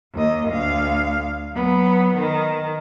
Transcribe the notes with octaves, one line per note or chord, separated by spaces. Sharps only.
D#2 D#5
D2 F5
F#3 B3
D#3